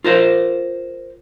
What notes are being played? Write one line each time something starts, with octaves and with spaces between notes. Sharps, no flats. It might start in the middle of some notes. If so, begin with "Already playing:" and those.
F4 A#4 C5 F5